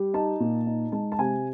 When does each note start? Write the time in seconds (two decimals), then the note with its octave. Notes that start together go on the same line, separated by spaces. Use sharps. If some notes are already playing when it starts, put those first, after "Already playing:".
Already playing: G3
0.14 D#4 A5
0.40 A#2
0.67 D#4
0.92 G#3 A5
1.12 A5
1.18 C3 G#5